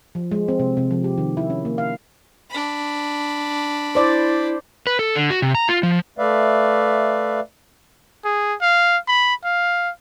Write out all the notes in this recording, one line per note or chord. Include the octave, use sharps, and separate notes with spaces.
F3
G#3
C4
C3
C3
F3
G4
D#3
E4
C#4
A#3
F5
D4 B5
E4 C5 D5
B4
A4
D3
F#4
C3
A#5
F4
F3
A3 B4 D5 E5 F5
G#4
F5
B5
F5